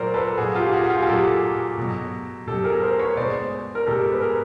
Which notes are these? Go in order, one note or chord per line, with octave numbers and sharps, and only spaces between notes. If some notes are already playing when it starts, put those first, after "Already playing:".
Already playing: A#2 F#3 A#4 C5 D5
A4 B4
A#2 F#3 F#4 G#4
F4 G4
F#4 G#4
F#4
F4 G4
G#4
A#2 F#3 G4 A4
B2 F#3
B2 F#3 G4 A4
G#4 A#4
A#4 C5
B4 C#5
B2 G#3 C5 D5
A#4
B2 G#3 G4 A4
B4
G#4 A#4